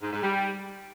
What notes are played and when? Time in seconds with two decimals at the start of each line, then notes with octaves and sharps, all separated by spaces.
0.02 G#2
0.13 G#2
0.23 G3